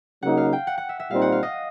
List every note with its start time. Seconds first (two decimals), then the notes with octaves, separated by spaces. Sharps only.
0.23 C#3 F#3 A#3 D#4 F#5
0.37 F5
0.53 G5
0.67 F#5
0.78 F#5
0.89 E5
1.00 E5
1.10 A#2 G3 C4 D#4 F5
1.22 F#5
1.32 F5
1.43 D#5